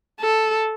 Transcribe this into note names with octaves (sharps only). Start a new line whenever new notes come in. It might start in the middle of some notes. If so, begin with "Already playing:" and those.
A4